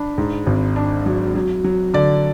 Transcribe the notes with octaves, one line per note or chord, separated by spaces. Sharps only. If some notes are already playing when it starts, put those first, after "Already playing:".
Already playing: D4 B5
G#2
G#1
D4
F#3
F#3
F#3
D3 D5